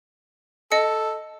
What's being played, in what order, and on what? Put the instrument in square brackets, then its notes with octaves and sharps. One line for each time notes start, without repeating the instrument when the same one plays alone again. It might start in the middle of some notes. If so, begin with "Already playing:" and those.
[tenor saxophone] A4 [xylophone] D#5 C#7